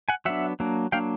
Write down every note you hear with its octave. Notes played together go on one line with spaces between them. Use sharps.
F#5 G#5
F#3 B3 D4 E5 F#5
F#3 A#3 D4
F#3 A#3 D4 F5 G5